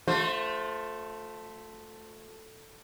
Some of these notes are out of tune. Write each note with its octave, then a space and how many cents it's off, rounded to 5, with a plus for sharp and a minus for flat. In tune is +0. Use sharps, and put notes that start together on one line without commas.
A3 +0 F4 +45 C5 +0